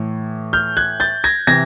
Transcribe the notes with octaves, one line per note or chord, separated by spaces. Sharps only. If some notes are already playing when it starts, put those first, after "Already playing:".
Already playing: A2 E3
F6 G6
F#6 G#6
G6 A6
G#6 A#6
C3 E3 G#6 A#6